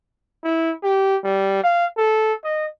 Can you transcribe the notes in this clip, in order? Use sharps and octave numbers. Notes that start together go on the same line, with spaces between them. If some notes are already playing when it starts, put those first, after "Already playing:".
E4
G4
G3
F5
A4
D#5